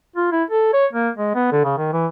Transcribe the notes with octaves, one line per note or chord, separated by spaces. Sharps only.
F4
E4
A4
C#5
A#3
G#3
B3
D3
C#3
D#3
E3